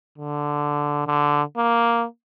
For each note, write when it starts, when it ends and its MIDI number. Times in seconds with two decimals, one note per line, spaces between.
0.18 1.04 50
1.07 1.43 50
1.57 2.06 58